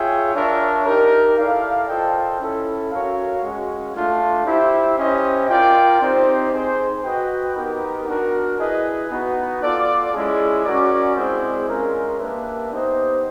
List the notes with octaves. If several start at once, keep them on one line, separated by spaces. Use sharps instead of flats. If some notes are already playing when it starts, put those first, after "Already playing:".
Already playing: F4 G#4 C#5 E5 G5
D4 F4 A#4 C#5 E5
D#4 G4 A#4
E4 A4 D5 F5
F4 A4 C5 D#5 G5
C#4 E4 A4
C#4 F#4 A#4 C#5 F5
G#3 C#4 F#4
A3 D4 F4
E4 G4 C5 E5
C#4 E4 G4 C5 D#5
F4 A#4 D5 G5
C4 D#4 G4 C5
D#4 G#4 C5
F#4 B4 D#5 G5
B3 D#4 G4 A#4
D4 F#4 A#4
E4 G#4 B4 D#5
B3 D#4 F#4 B4
F4 A4 D5
G#3 C#4 E4 G#4
C#4 F#4 A#4 D5
G#3 C4 E4 G#4 C5
G#3 C#4 F4 A#4
A#3 D4 G4 B4 E5
B3 D#4 G4 C5 D#5